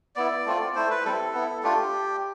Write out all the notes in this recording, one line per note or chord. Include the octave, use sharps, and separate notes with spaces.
B3 E4 D5
A3 C4 F4
A3 E4 C5
B4
G3 C4 E4 A4
B3 E4
A3 D4 F4 G4